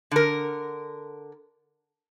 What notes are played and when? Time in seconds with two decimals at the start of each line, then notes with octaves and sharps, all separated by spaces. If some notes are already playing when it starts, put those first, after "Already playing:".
0.11 D3 A#4